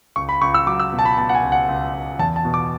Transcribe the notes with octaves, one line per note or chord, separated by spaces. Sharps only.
C#2 C#6
B5
C#2 C#6
E6
F#3 D6
E6
B2
A5
B5
B2 A5
F#5
G#5
C#2
F#5
C#2
C#2
E2 A5
A5
B2
D6